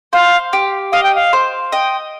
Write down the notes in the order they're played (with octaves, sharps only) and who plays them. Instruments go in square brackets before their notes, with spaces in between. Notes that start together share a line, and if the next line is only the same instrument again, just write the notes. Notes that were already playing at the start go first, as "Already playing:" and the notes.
[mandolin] C5 [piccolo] F5
[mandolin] G4
[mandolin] D#5 [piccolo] F5
[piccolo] G5
F5
[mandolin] C5
[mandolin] D#5 [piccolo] G5